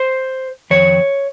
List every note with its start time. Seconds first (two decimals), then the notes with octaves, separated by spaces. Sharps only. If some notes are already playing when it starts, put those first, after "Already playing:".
Already playing: C5
0.70 F2 D#3 C#5